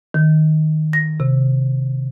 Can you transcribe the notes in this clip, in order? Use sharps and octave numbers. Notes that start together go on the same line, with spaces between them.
D#3
A#6
C3